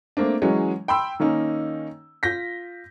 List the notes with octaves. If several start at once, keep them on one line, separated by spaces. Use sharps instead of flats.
A3 A#3 C4 D4
E3 F#3 G#3 C#4
G5 B5 C6 E6
D#3 A#3 C#4 D#4
F4 G6 A#6 B6